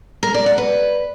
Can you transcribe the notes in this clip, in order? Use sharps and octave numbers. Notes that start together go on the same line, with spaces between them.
A#4
D5
F#5
B4